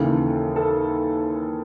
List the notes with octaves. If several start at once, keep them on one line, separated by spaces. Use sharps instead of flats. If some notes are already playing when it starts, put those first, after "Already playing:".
Already playing: D#2 C#3 E3 A4
A4